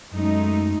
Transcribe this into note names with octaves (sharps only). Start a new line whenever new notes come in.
F#2 G#3 A3 D#4